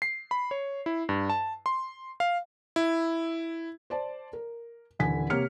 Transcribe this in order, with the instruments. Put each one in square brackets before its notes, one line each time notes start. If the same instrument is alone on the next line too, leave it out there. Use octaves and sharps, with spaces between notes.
[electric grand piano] C7
B5
C#5
E4
G2
A5
C6
F5
E4
[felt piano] C5 D5 A5
A#4
D#1 D3 E3 G#5 B6
C3 A#3 G4 C#5 F6 C#7